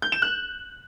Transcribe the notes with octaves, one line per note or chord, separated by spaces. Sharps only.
G6
E7
F#6